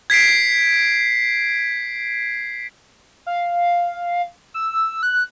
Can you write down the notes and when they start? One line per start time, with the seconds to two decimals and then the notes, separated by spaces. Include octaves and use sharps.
0.10 G#6 B6 C7 D7
3.26 F5
4.54 E6
5.03 F#6